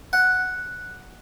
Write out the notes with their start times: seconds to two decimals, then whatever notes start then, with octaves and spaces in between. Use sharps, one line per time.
0.13 F#5